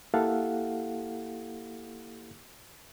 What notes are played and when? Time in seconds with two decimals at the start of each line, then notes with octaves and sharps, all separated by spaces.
0.14 A#3 E4 G4 A4 F5 F#5